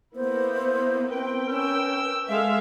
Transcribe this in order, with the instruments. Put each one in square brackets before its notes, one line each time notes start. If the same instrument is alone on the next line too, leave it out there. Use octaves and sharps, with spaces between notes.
[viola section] A#3 B3 E4 [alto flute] C5
[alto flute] C4 [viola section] A#4 B4 G5
[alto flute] C#4 [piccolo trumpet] E6
[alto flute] G#3 [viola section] A4 E5 F5